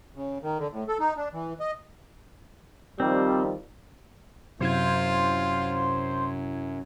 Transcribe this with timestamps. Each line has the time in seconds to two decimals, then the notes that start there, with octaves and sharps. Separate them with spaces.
0.16 C#3
0.43 D#3
0.58 D3
0.72 A2
0.88 A4
1.00 D#4
1.17 D4
1.33 E3
1.60 D#5
3.00 D#3 F3 G3 C4
4.60 F#2 C3 E4 F4 C5 G#6